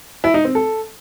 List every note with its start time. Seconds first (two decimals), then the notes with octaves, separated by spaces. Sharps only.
0.24 E4
0.34 D#4
0.45 C4
0.55 A4